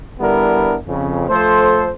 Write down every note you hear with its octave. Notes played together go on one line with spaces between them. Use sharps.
D3 G3 B3 D4 E4 A#4
F2 C#3
F3 A3 A4 C5